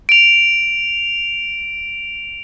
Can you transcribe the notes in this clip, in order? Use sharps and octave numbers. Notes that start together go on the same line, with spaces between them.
D7 F7